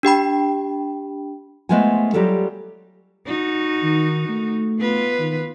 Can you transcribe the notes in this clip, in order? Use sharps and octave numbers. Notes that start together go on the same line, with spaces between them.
D4 G4 G5 B5
G#3 A3 B3 F4 C5 G#5
F#3 G3 F4 G4 A4
D#4 F#4
D#3
A3
B3 F4 B4
D#3